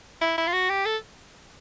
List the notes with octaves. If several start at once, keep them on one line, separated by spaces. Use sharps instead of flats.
E4
E4
F4
F#4
G4
A4